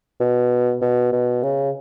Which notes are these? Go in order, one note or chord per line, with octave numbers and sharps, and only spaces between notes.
B2
B2
B2
C#3